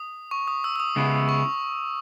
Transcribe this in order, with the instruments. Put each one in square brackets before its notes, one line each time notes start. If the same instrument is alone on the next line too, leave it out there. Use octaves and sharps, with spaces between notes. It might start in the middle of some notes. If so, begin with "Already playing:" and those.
Already playing: [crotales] D#6
C#6
D#6
E6
E6
D#6
[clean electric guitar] C#3 G#3 B3 E4
[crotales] C#6